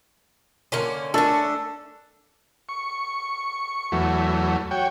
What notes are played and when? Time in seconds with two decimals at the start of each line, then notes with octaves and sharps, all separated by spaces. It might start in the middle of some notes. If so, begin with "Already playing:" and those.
0.72 D3 A#3 C#4 A#4 C6
1.14 A3 C#4 D4 A4 A#4 A5 A6
2.69 C#6
3.92 E2 F#3 A3
4.71 F#4 C#5 G5